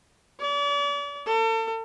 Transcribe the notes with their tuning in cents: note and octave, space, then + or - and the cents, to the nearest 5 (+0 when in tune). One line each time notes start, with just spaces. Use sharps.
D5 -40
A4 +40